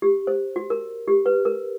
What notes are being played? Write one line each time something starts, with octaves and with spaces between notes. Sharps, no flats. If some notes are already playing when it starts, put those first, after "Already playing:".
G4
C5
F#4
A#4
G4
B4
A#4